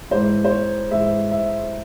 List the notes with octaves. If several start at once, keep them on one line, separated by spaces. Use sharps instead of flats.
G#2 E3 G#3 C5
C5
C#5
G#2 E3 G#3 E5
E5